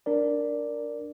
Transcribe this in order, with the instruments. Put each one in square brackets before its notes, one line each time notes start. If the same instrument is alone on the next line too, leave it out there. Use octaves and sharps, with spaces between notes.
[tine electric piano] D4 A#4 D5